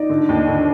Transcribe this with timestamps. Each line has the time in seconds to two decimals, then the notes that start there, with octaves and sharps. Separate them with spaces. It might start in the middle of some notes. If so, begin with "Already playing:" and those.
Already playing: D#4 D5 D#5
0.10 D3
0.29 D#2
0.48 D3